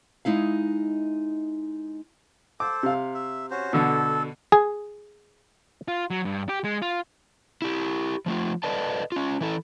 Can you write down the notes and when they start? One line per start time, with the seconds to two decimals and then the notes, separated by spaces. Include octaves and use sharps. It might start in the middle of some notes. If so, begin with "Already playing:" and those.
0.25 G#3 D#4 E4 F5
2.60 A4 C5 D6
2.83 C3 F5
3.14 E5
3.51 C#4 F#4 C5
3.73 B2 D3 A4
4.52 G#4
5.88 F4
6.10 F#3
6.25 G2
6.49 G4
6.64 G#3
6.82 F4
7.62 E4 G4
8.26 F3 A3 F4
8.63 A4 B4 D5 D#5 A5
9.12 C#4 F4
9.41 E3 E4 A4